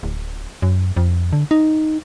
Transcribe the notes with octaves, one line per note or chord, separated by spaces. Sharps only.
D1
F#2
F2
D3
D#4